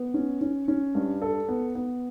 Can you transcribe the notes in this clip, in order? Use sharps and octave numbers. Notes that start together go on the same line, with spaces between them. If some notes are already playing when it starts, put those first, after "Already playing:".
Already playing: B3
C#4
C#4
C#4
G2
A4
B3
B3